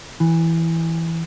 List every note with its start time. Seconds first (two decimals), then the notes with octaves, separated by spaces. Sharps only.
0.20 E3